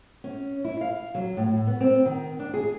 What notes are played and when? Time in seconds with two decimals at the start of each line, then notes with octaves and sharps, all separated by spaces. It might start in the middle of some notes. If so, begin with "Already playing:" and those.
0.24 C#4
0.65 E4
0.81 F5
1.15 F#3
1.37 A2
1.67 B3
1.81 C4
2.06 D#3
2.39 D4
2.54 G#4